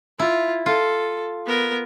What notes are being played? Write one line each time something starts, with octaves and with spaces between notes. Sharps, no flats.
E4 F4
F4 A4
B3 A#4